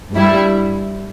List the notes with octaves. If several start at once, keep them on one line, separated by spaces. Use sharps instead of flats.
G2 G3 E4